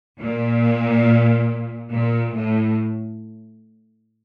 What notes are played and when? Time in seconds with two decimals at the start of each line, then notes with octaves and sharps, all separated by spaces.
0.20 A#2
1.91 A#2
2.34 A2